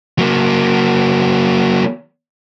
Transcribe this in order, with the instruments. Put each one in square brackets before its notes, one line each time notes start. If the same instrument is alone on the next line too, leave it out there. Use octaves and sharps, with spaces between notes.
[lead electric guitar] F#3 A#3